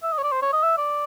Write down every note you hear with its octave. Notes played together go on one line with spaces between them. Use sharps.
E5
D#5
C#5
D5
C5
C#5
D#5
E5
D5